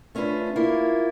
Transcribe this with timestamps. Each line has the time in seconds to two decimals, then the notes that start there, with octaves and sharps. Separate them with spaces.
0.15 A3 C#4 D4 F4 B4
0.56 A#3 E4 F4